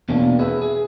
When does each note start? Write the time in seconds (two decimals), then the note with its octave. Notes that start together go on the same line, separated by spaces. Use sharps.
0.09 E2 B2 F#3 A#3 C4 D4
0.39 G#4 B4 E5
0.62 G#4